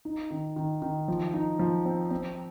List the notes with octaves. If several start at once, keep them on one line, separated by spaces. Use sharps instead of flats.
D#4
D#3
D#3
D#3
F3
D#4
F3
C4
C4